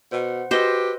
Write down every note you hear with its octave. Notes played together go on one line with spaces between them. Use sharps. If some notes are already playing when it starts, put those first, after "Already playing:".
B2 C5 F#5
F#4 G4 B4 C5 D#5 E6